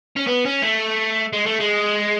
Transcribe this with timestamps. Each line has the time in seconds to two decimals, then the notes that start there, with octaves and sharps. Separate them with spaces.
0.16 C#4
0.27 B3
0.45 C#4
0.62 A3
1.33 G#3
1.46 A3
1.60 G#3